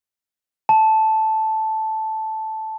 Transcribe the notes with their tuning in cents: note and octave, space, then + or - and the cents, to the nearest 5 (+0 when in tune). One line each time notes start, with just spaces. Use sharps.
A5 -5